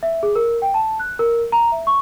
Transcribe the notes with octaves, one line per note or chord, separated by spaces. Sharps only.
E5
G#4
A#4
G5
A5
F#6
A#4
A#5
E5
C#6